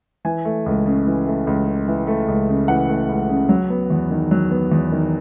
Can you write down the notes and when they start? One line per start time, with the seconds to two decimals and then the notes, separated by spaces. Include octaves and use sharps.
0.25 E3 G#5
0.45 A3
0.66 C#2
0.86 C#3
1.07 E3
1.27 A3
1.47 C#2
1.67 C#3
1.87 E3
2.07 A3
2.28 C#2
2.49 C#3
2.68 E3 F#5
2.89 A3
3.09 C#2
3.29 C#3
3.49 F#3
3.70 B3
3.90 E2
4.10 D#3
4.31 F#3
4.51 B3
4.72 E2
4.92 D#3